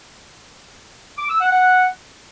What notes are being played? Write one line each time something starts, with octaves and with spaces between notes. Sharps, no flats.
D6
E6
F#5
F#5